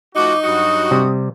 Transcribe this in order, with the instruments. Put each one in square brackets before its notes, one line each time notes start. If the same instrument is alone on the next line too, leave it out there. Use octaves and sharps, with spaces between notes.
[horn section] F3 A3 F#4 [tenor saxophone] D#4 [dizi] D6
[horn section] G2 F#3 F#4 [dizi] D#6
[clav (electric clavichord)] C3 G3